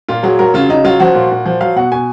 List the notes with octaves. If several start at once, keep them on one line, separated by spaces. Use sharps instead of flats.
A#2 F4
F#3 G#4
F#3 A#4
C#3 F4
C#3 D#4
F#3 F4
F3 F#4
A#2
A#2
F3
F#3 F5
B2 F#5
B2 G#5